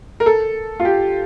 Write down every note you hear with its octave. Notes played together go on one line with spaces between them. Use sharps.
A#4
A4
F4
G4